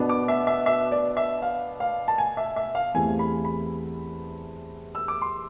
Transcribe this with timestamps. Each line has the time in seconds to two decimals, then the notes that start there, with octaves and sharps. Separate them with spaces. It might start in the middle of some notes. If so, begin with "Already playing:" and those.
Already playing: B2 B3 D4
0.09 D6
0.28 E5
0.47 E5
0.66 E5
0.91 D5
1.17 E5
1.42 F5
1.80 F5
2.08 A5
2.18 G#5
2.37 E5
2.56 E5
2.75 F5
2.94 E2 C3 E3 A3 G#5
3.19 B5
3.45 B5
4.95 E6
5.08 D6
5.22 C6